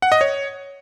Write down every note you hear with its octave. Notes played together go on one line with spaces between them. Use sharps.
F#5
D#5
C#5